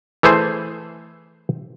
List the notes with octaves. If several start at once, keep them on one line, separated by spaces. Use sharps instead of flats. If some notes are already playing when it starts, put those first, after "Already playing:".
E3 A3 G#4 C5